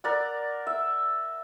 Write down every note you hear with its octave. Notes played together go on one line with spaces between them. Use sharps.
A#4 D5 F#5
E5